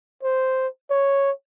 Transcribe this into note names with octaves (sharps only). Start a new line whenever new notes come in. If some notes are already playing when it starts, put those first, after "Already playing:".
C5
C#5